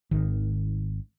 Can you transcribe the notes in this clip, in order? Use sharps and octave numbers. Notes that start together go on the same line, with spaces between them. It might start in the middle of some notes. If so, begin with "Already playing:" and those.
G#1 D#3